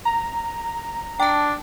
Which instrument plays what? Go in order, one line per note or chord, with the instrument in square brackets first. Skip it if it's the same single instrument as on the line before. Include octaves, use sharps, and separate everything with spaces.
[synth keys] A#5
[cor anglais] D4 [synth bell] G5 A5